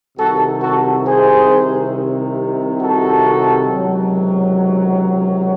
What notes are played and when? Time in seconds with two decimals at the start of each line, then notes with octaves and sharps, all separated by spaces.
0.18 C2 C3 D#3 F#4 A4
0.62 F#4 A4
1.06 G#4 C5
2.81 F#4 A4
3.69 C#2 C3 D#3 F#3